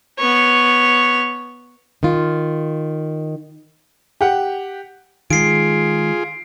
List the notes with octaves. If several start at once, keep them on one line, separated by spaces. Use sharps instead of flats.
B3 C#5
D#3 F4
G4 F#5
D#3 G#3 F4 G#4 C7 D7